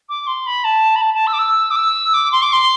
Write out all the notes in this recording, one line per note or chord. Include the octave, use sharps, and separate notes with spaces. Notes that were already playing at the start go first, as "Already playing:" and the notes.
D6
C6
B5
A5
B5
A5
A5
E6
D6
E6
D6
E6
D6
C6
D6
C6